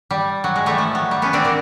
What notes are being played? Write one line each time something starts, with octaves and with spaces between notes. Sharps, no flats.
G3
F#3
G#3
G3 A3
F3
F#3
G3
B3 C#4
C4 D4
A#3 C4